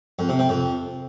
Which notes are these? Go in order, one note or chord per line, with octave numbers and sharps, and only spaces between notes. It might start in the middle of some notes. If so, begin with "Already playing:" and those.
F2
C3
C3
F2